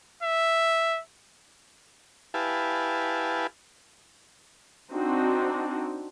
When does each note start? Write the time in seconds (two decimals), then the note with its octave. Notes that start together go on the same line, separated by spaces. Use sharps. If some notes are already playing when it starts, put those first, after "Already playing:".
0.23 E5
2.34 E4 G4 B4 F5 G#5 A5
4.91 C4 D4 D#4 F#4